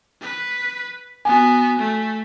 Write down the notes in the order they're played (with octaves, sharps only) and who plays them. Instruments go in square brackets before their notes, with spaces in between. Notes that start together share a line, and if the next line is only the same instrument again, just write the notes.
[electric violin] B4
[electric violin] B3 F#4 [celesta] G#5
[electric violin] A3